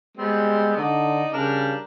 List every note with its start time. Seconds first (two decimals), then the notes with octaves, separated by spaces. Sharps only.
0.17 G3 G#3 B3 C4
0.77 D3 D#4 D5
1.33 C#3 G3 D4 A#4